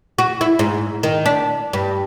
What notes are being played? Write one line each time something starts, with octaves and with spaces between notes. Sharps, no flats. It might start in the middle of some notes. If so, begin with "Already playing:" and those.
F#4
E4
G#2
D#3
D4
G2